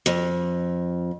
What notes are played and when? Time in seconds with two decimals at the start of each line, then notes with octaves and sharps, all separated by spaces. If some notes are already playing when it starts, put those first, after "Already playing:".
0.06 F2